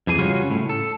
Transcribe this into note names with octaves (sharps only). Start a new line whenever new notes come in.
F2 E3 G#4 G#5
C#3 G3 C#4 F4 F#4 G#4
A2
A4